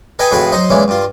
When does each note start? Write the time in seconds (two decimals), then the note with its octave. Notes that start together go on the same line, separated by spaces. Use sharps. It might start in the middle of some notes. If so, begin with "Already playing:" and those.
0.19 G#4 A4 B4 D#5 G5 G#5
0.32 F2 A2 F#4 G#4 B4 B5
0.52 F#3 D#4 C5 D#5
0.70 A#2 E3 G#3 C#4
0.88 G2 F4